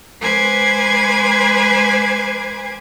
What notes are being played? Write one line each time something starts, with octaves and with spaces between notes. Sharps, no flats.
G#3 B4 C5 G#5 D6 G#6